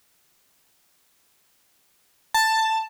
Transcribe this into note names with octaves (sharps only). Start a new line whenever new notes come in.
A5